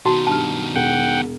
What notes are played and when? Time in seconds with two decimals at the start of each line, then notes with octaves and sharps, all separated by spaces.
0.06 B2 D#3 F#4 A5
0.27 G2 G4 A5 F6
0.76 E1 F#5 G5